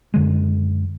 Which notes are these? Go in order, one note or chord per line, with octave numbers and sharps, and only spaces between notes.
F#2 D3 G#3